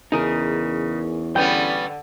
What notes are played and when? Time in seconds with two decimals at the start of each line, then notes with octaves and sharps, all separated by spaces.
0.12 E2 C#3 D#4 G#4 A#4
1.36 D3 G3 B3 C#4 G5